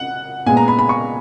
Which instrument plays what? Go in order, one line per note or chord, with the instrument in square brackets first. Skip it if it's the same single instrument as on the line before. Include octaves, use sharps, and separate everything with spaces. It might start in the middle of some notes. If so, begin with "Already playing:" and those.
Already playing: [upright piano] F#5
A#2 G#3 B3 G#5
A#5
B5
B5
C#6